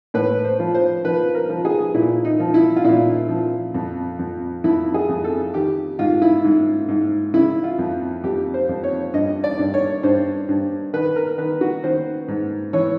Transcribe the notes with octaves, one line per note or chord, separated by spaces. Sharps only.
A2 B4
C5
F3
C5
F3 B4
A#4
F3
G#4
A#2 E4
D#4
F3
E4
F4
A#2 E4
F3
F2
F2
F2 E4
G#4
F2
A4
D#3 G4
G#2 F4
E4
G#2
G#2
C#3 E4
F4
F2
F2 G4
C5
F2
C#5
G2 D#5
D5
G2
C#5
G2 C5
G2
D#3 B4
A#4
D#3 B4
F#4
D#3 C5
G#2
E3 C#5